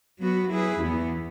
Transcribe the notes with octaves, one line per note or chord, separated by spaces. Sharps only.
F#3 B3 F#4 B4
F#3 E4 G#4 B4
E2 E3 B3